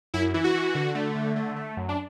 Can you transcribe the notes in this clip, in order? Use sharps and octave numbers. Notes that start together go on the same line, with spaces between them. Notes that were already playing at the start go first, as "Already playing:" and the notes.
F#2 E4
E3 E4
F#4
E3
D3
A3
D3
A3
A3
F#2
D4